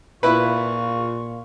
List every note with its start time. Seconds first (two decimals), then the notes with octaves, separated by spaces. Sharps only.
0.23 A#2 E4 F4 B4 C#6